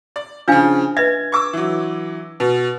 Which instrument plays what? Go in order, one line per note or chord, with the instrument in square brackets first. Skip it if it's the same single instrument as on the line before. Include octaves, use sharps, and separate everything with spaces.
[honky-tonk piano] D5
[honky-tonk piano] C#3 F3 [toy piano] D4 F5 G#5
[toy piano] B4 D#5 E5 [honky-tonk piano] G#6
[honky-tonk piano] C#6 D6 E6
E3 F#3
[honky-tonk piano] B2 [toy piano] B4